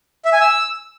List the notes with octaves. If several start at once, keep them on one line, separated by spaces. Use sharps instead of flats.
E5
G#5
E6